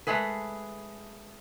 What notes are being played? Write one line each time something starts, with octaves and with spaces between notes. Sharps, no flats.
G#3 A3 G#4 B4